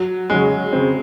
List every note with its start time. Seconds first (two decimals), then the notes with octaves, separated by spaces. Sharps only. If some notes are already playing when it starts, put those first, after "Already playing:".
Already playing: F#3
0.30 C#3 F#3 G#3 C#4
0.73 C#3 G#3 C4